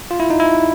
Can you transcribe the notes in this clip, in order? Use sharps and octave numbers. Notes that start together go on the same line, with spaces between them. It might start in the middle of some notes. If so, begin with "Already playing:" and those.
F4
E4
D#4
E4